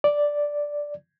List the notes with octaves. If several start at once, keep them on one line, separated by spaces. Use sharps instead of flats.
D5